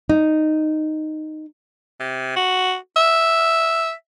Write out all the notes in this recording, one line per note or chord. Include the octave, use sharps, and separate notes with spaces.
D#4
C3
F#4
E5